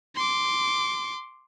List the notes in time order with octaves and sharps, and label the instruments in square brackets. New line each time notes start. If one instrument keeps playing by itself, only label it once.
[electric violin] C6 D6